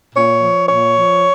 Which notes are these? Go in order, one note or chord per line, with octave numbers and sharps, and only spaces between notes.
A#2 C#5
F3
A#2 C#5
F3